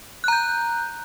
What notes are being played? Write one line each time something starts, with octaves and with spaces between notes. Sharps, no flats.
A#5 F#6 G6